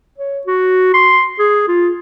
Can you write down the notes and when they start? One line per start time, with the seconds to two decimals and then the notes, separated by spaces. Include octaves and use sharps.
0.18 C#5
0.47 F#4
0.94 C6
1.39 G#4
1.68 F4